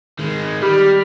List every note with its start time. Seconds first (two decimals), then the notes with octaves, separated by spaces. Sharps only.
0.19 D#3 G#3
0.62 G3 G4 B5 F6